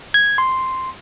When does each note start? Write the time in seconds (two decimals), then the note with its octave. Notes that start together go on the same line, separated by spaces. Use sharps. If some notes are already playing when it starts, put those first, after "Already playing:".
0.14 G#6
0.38 C6